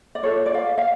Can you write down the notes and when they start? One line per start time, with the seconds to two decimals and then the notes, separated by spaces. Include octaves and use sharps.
0.15 D5
0.23 F4 A4 C#5
0.46 D5
0.54 F5
0.78 F5